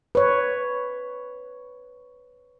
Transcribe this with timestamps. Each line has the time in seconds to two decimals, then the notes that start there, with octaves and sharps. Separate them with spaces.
0.15 B4 C#5